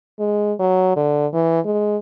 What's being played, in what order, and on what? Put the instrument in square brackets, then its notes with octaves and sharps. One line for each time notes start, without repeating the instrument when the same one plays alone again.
[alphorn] G#3
F#3
D3
E3
G#3